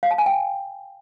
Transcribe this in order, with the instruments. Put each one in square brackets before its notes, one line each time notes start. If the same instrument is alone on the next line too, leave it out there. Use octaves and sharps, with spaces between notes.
[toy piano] F5
A5
G#5
G5